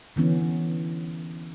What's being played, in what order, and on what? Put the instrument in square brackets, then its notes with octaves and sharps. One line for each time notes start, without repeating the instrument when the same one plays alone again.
[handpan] D3 E3 B3 C#4